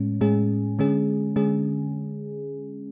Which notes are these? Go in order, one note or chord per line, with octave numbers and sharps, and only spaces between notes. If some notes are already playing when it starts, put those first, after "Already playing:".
Already playing: A2 G#3 C#4
A2 G#3 C#4 G#4
D3 G#3 C#4 G#4
D3 G#3 C#4 G#4